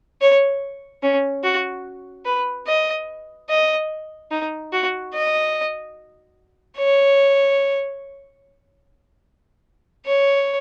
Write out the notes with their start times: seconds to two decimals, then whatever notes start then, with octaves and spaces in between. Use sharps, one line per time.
0.21 C#5
1.02 C#4
1.44 F#4
2.25 B4
2.67 D#5
3.50 D#5
4.31 D#4
4.72 F#4
5.14 D#5
6.77 C#5
10.06 C#5